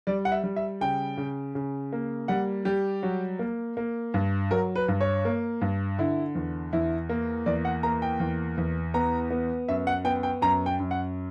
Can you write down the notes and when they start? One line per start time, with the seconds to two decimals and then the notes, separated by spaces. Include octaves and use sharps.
0.07 G3 D5
0.25 F#5
0.32 E5
0.44 G3
0.56 E5
0.81 C#3 G5
1.17 C#3
1.55 C#3
1.92 A#3
2.28 G3 F#5
2.65 G3 G4
3.03 F#3
3.39 A#3
3.77 A#3
4.14 G2
4.51 F#3 A#4
4.76 B4
4.88 G2
5.01 C#5
5.25 A#3
5.61 G2
5.99 D3 E4
6.35 E2
6.73 E2 E4
7.09 A#3
7.46 E2 D5
7.65 F#5
7.83 A#3 A#5
8.02 G5
8.20 E2
8.57 E2
8.94 B3 A#5
9.31 B3
9.68 F#2 E5
9.87 F#5
10.04 B3 G5
10.23 G5
10.42 F#2 A#5
10.66 G5
10.79 F#2
10.91 F#5